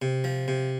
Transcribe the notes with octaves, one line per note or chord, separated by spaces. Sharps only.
C3
F3
C3